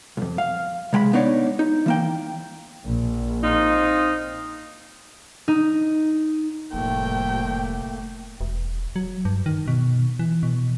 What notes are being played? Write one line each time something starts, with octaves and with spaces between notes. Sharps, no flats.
B1 F2
F5
C3 G#3 G5 B5
B3 D4 D#4 C#5 D5
D#4
E3 A#3 G5
A#1
C4 D#4 F4
D#4
F1 A2 F3 G3 A3 A#3 G5
E1
F#3
G2
D#3
B2
E3
B2